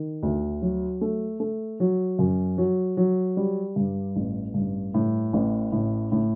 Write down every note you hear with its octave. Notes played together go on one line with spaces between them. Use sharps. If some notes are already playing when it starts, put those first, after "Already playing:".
Already playing: D#3
D2
F#3
A3
A3
F#3
F#2
F#3
F#3
G3
G2
A1
G2
A2
A1
A2
A2